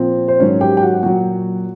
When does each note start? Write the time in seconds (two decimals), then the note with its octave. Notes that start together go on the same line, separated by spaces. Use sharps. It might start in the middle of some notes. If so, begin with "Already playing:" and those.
Already playing: A#2 F3 C4
0.28 C5
0.40 G#2 D#3 F#3 C#4 C#5
0.61 G4 G5
0.77 G5
0.82 F#4 F#5
1.03 A#2 F#3 F#4 F#5